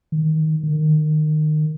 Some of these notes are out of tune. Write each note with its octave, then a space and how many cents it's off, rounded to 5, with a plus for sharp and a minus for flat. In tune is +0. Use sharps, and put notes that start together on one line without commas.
D#3 +10
D#3 -25